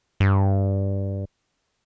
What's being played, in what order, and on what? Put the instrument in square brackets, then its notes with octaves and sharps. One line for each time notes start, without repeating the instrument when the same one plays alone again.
[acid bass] G2